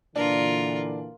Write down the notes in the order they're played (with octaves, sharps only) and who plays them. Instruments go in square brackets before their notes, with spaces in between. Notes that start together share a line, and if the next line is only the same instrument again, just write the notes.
[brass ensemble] A#2 D3 E3 [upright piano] D4 [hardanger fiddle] F4 A#4